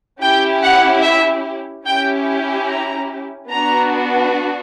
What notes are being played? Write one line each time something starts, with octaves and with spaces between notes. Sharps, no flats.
C#4 E4 G4 G5
F#5
E5
C#4 E4 G4 G5
A#5
B3 D4 F#4 A#5